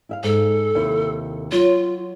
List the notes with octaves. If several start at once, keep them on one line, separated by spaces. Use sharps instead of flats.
E4 E5 F5
G#2 A4
D#2 C3 E4
F#3 F4 C#5